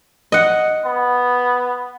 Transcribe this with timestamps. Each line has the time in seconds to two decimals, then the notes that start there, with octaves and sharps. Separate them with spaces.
0.32 D#5 F#5
0.85 B3